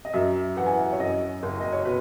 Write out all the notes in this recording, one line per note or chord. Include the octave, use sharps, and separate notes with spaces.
D#5
F#2 E5
E3 F#5
G#5
F#5
C#5
F#2 D#5
F#1
D#5
C#5
B2 B4